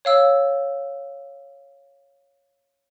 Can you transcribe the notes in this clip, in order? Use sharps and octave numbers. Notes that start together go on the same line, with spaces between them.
C#5 F5 E6